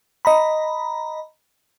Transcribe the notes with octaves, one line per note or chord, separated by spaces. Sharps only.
D#5 A#5 B5